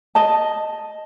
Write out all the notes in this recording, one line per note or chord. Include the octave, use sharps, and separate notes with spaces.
D#5 A5